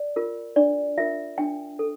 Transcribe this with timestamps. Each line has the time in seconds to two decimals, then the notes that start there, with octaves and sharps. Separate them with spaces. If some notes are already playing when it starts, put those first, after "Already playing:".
Already playing: D5
0.16 F4 A#4
0.56 D4 D5
0.98 F4 A#4 E5
1.38 D4 G5
1.79 A4